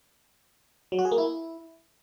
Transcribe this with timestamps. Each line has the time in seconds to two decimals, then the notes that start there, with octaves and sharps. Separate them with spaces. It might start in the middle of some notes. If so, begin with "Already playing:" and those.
0.92 F#3
0.99 F#4
1.05 G#4
1.12 A#3
1.18 E4